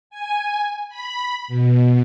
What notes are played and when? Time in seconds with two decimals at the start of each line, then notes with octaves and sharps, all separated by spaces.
0.10 G#5
0.89 B5
1.48 B2